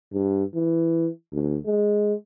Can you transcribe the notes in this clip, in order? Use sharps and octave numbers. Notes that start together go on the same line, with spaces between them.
G2
E3
D2
G#3